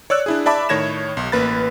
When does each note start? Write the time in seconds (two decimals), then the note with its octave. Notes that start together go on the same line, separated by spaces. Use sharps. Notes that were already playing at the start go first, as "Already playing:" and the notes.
0.10 C#5 D5 E6 F#6
0.26 D4 E4 G#4
0.46 D5 E5 A5 B5 D6
0.69 A2 D#3 C#5 G#6 A#6 E7
1.17 B1
1.32 A1 A#3 B4 B5 A6